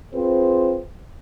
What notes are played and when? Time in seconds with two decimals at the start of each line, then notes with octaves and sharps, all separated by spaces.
0.14 C4 F4 G#4 B4 C5